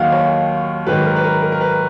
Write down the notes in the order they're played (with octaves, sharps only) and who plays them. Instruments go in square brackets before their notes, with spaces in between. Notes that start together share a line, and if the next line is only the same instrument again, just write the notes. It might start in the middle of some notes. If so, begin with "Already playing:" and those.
Already playing: [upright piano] D#2 D#3 F#3 F5 F#5
C#5
G#2 D#3 F#3 B4
A#4
B4
A#4
A#4
A#4
B4